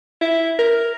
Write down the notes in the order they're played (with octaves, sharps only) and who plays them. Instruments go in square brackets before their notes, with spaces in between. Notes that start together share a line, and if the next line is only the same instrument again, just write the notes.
[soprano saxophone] E4
A#4